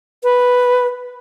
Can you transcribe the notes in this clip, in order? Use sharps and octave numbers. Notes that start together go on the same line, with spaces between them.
B4